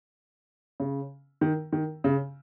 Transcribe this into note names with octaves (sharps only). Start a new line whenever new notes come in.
C#3
D#3
D#3
C#3